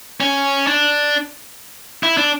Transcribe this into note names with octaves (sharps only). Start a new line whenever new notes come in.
C#4
D4
E4
D4